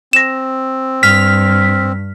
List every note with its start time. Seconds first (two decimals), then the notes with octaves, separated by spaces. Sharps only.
0.13 C4 A#6 E7
1.03 G2 F6 B6